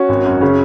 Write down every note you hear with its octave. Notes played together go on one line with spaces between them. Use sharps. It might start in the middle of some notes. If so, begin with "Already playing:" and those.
Already playing: C#4 F#4
G#1
F#2
C#3 C#4